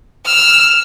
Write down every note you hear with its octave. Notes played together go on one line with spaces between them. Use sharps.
E6 F6